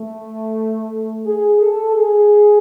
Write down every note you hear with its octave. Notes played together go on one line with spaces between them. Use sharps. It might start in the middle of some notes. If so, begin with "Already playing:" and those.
Already playing: A3
G#4
A4
G#4